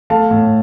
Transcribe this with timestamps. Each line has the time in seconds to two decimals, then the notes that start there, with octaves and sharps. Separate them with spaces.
0.10 A3 F5 A5
0.31 A2